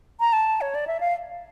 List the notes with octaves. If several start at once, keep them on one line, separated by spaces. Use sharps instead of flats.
A#5
A5
C#5
D5
E5
F5